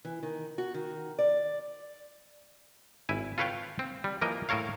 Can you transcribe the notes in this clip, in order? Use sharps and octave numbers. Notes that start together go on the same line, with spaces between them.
E3
D#3
F#4
D#3
D5
G#1 E4 G#5
F4 A4 B4 C#5 F5 G5
C4
G3
E3 F3 A#3 A#4 D#5
A2 A4 A#4 C#5 F5